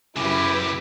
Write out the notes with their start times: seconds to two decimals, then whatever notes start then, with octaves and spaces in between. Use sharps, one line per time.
0.17 F#2 C#3 E4 G4 B4 D6